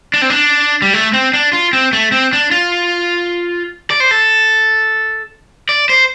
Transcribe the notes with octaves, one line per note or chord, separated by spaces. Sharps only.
D4
C4
D4
G3
A3
C4
D4
F4
C4
A3
C4
D4
F4
D5
C5
A4
D5
C5